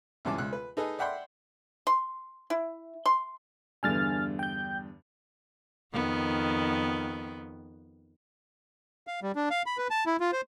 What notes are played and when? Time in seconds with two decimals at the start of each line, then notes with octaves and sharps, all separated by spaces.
0.25 C#2 G2 E3 C#4 A5 D6
0.38 C#2 F#6
0.53 B4
0.77 D#4 G#4 A4 B4 D#5
0.99 D5 E5 F#5 G5 B5 C6
1.87 C6
2.50 E4
3.06 C6
3.83 E2 G2 D3 G#5 F6 A6
4.39 G5 G6
5.93 F2 D#3 B3
9.07 F5
9.23 G3
9.36 D4
9.50 F5
9.66 B5
9.78 B4
9.91 A5
10.06 E4
10.20 F4
10.32 C5